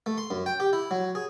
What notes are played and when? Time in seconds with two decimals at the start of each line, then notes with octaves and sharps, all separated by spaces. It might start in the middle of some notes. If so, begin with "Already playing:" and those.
0.06 A3
0.18 C6
0.30 F#2
0.46 G5
0.60 G4
0.73 E4
0.91 F#3
1.15 G#4